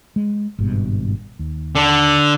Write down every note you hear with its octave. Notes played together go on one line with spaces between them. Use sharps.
G#3
G#1 G2 B2
D#2
D3